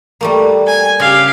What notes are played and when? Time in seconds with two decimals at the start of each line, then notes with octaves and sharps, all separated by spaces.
0.21 G3 A3 A#3
0.67 G#5
1.00 C#3 G4 F5